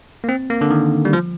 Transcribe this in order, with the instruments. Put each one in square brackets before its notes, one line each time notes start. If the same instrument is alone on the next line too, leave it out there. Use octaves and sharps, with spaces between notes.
[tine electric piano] A#3
C4
A#3
D3
D#3
G3
F3